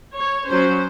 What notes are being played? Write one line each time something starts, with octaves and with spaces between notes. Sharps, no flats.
C#5
F#3 C#4 C5